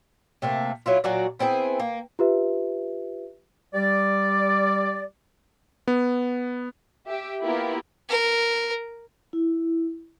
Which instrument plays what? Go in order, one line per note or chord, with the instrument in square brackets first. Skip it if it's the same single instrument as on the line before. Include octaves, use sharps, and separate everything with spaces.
[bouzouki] C3 A3 A#3
F#3 E4 F4
A#2 F#3 F#4 D5
B3 C4 E4 G#4
A#3
[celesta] F4 G4 B4 E5
[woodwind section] G3 D5
[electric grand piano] B3
[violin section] G4 E5
A#3 B3 E4 F4 G4 A#4
[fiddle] A#4
[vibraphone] E4